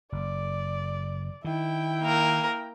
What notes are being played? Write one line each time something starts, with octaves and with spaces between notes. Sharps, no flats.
F#1 D5
D#3 E4 G5
A#3 A#4